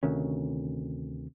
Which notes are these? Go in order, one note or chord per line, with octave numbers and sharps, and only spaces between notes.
D2 C3 D#3 C#4